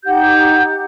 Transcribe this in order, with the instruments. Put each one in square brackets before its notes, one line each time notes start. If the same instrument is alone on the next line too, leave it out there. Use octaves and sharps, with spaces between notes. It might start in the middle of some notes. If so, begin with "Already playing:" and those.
[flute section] D#4 G4 F#5 G6